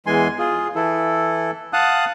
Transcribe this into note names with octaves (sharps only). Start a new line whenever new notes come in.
E2 E3 G#3 G#5 C6
F4 G#4
E3 E4 A4
F5 F#5 A5 D#6 F#6